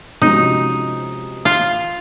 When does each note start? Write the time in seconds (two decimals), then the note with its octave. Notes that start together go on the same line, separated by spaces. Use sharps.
0.21 C3 F3 G#3 C#4 D#4 F#4
1.45 F4